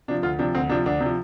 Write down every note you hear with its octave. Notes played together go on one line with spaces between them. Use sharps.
C3 F3 D4
D2 F4
C3 F3 D4
D2 C4
C3 F3 D4
D2 D4
C3
F3